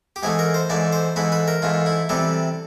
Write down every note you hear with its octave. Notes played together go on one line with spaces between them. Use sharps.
G4
G#2 E3 A3 G#4
A#4
C5
G#2 E3 A3 D5
C5
G#2 E3 A3 B4
B4
A#4
G#2 E3 A3 F4
E4
C3 E3 G3 A4